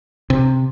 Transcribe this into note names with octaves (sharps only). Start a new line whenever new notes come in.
C3